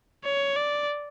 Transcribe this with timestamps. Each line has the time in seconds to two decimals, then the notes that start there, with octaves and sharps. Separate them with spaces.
0.24 C#5
0.57 D5